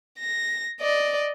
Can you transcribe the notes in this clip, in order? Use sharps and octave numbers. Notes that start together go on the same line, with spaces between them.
A#6
D5 D#5